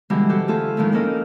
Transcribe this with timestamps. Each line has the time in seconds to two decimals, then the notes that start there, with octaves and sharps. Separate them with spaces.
0.10 B2 D3 E3 G3 G#3
0.29 F#4 G4 A4 C5
0.48 A3 F4 G#4 A4
0.77 A2 D#3 F3 G#3 A3
0.92 A3 A#3 C#4 A4 A#4 D#5